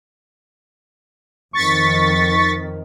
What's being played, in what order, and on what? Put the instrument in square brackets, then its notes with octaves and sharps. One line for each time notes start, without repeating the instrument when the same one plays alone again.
[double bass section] F2 D#3 [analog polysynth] C#6 A6 B6